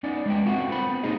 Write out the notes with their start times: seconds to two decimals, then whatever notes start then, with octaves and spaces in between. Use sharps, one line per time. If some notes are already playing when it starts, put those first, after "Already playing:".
0.04 B3 C#4 D#4 D5
0.26 G#3 B4 G5
0.45 D3 C4 F4 F#4 F5 F#5
0.69 B3 C4 C5 B5
1.03 G3 A#3 D#4 G#4 D#5